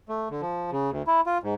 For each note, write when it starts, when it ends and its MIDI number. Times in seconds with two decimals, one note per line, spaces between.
0.09 0.28 57
0.30 0.41 50
0.42 0.71 53
0.72 0.90 49
0.90 1.02 38
1.07 1.21 64
1.26 1.38 65
1.43 1.54 44